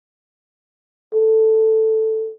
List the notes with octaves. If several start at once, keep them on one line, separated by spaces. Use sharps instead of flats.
A4